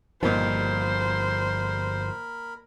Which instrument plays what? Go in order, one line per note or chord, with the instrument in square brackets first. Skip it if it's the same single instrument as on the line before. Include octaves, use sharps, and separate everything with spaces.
[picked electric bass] G1 G2 F3 [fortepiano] A#2 D#3 [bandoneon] A#4 B5 [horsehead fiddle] C5